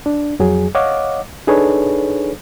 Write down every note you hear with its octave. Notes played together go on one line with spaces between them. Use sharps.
D4
F2 F#3 G#4
C#5 D#5 F5 F#5 D6
D4 D#4 G#4 A4 B4 C#5